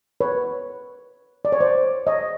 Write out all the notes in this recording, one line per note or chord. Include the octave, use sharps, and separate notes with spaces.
B4 C#5
D5
C#5
C5 D5
C#5 D#5